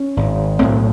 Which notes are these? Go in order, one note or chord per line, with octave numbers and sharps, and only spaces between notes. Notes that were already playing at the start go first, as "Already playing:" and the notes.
Already playing: C#4
G#1 G#2
B1 A2 C4